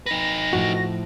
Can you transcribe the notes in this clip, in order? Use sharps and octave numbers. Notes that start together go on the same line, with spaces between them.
D#4 B4 A#6
A2 F3 F#4